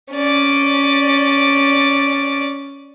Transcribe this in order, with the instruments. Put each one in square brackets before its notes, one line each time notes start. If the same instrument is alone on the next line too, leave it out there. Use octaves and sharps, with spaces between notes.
[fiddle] C#4 D5